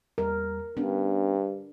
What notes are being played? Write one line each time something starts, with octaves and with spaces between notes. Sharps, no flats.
E2 G3 A#4
G2 B3 C#4 D4